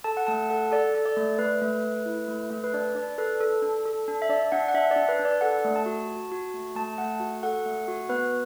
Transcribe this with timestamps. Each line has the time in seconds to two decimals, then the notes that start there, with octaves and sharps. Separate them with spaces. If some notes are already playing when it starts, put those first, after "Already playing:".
0.04 A4 A5
0.17 F#5
0.27 A3 A5
0.50 A4 F#5
0.71 A4 D5
0.95 A4
1.06 D5
1.17 A3
1.39 A3 B4
1.62 A3
1.84 A3
2.06 E4
2.28 A3
2.50 A3
2.64 B4
2.74 D4 D5
2.95 D4 D5
3.18 A4 B4
3.40 A4
3.62 D4
3.85 A4
4.08 D4
4.22 E5
4.29 D4 D5
4.52 D4 F#5
4.69 F#5
4.74 D4 E5
4.91 D5
4.96 D4
5.09 B4
5.19 D4
5.25 D5
5.41 A4 F#5
5.65 A3
5.76 A5
5.86 F#4
6.08 F#4
6.31 F#4
6.54 A3
6.76 A3 A5
6.98 A3 F#5
7.20 F#4
7.43 A4 F#5
7.66 A3
7.88 F#4
8.09 B3 B4